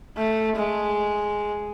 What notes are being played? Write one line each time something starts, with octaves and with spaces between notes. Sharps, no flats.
A3
G#3